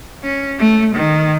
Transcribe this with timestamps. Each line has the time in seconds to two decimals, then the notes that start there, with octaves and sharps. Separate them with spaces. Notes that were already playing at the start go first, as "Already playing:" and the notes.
0.23 C#4
0.59 A3
0.95 D#3